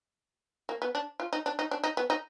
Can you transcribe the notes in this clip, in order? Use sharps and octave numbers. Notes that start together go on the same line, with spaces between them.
A#3
B3
D4
F4
D#4
D4
D#4
D4
D#4
B3
D#4